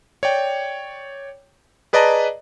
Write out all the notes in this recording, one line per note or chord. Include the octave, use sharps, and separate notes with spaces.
C#5 D5 G5
G#4 B4 D5 D#5 A5 A#5